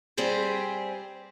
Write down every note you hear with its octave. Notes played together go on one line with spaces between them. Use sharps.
G3 C4 G4 G#4 C5